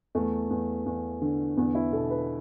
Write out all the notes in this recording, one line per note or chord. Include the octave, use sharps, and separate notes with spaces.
E2 A3
E2
E2
D3
E2 B3
E4
B2 A4
B4